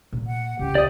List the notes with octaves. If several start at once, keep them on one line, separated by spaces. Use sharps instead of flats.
A#2
F#5
C#2 G4
D5 D#6